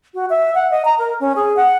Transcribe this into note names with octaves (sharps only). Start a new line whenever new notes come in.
F#4
E5
F#5
D#5
A#5
A#4
C#4
G#4
F#5